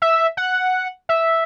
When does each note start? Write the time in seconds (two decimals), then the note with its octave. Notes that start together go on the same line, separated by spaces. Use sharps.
0.02 E5
0.37 F#5
1.09 E5